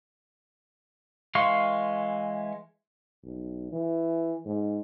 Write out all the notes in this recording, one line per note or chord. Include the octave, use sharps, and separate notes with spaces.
E3 G#3 F5 C6 C#6
B1
E3
G#2